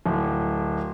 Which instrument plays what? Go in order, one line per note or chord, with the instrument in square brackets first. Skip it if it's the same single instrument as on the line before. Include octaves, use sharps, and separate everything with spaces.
[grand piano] D1